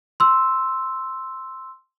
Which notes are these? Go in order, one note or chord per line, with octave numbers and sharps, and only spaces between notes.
C6 E6